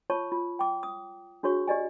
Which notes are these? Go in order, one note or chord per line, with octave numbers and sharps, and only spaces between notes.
F4 C#5 A5 C#6
F4
G5 D6
D#6
D4 F#4 G#4 C#5 C#6
G4 D5 D#5 G#5